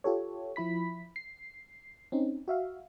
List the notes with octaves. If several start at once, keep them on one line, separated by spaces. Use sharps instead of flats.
F4 G4 A4 C#5
F3 E4 B5 B6
C7
C4 C#4 D#4
F#4 E5 F5